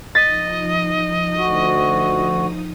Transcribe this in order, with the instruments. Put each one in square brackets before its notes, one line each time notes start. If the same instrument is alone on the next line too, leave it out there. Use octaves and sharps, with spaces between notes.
[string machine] F3 D#4 D#6 [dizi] D#5 [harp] A6 B6
[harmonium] D2 F#4